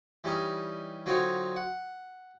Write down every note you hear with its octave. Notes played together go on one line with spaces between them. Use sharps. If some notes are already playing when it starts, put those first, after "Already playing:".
E3 G3 C#4 D#4
D3 F#3 C4 D#4 F4 C#5
F#5